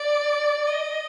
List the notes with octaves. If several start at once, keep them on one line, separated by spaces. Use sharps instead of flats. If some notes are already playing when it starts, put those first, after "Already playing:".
Already playing: D5
D#5